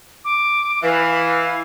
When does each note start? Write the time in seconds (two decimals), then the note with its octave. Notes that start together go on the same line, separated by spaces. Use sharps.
0.25 D6
0.83 E3 F5